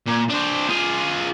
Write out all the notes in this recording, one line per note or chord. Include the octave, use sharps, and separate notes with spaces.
A#2
D4 C5
F4 G#4